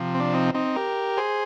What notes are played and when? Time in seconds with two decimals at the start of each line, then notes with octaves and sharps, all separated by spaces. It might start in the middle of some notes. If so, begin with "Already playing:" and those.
Already playing: C3 F3
0.15 C4
0.20 D4
0.34 C4 D#4
0.54 C4 D#4
0.76 G4 A#4
1.17 G#4 C5